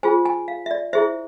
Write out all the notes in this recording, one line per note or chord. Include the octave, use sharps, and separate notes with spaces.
F4 G#4 C5 G#5
G#5
F5
E5
D5
E4 G#4 C5 E5